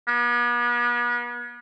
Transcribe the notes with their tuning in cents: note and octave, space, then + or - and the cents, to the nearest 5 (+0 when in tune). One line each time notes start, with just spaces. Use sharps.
B3 -40